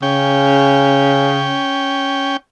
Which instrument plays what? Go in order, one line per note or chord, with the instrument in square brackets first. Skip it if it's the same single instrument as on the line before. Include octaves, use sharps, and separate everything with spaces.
[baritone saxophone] C#3 [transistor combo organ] C#4 G5